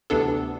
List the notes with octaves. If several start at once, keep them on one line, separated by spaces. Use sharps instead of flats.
D2 C3 E3 B3 D4 A4